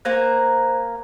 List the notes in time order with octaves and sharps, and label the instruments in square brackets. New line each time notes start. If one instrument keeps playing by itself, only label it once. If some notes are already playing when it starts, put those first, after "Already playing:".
[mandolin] A#3 G#5 A#5 [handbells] C5 F#6